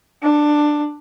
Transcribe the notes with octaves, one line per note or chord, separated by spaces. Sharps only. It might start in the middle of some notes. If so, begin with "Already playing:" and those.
D4